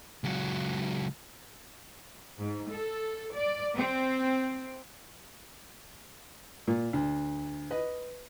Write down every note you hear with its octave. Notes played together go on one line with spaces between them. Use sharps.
C#2 F#3
G#2
A4
D5
C4
A#2
D2
B4 D#5